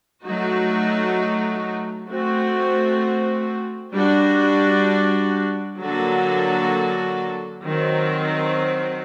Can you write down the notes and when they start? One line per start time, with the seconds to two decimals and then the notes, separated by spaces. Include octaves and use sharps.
0.25 F#3 A3 D#4 F#4
2.09 A3 C4 F#4
3.93 G3 D4 F#4
5.79 D3 F#3 A#3 F#4 A4
7.64 D#3 F#3 C4